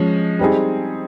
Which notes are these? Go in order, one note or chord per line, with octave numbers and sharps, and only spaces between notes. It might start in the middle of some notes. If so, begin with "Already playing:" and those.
Already playing: F3 G#3 C#4
G3 C4 D#4 G#4